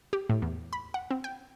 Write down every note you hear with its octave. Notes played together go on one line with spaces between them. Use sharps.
G4
A2
E2
B5
F#5
C4
G5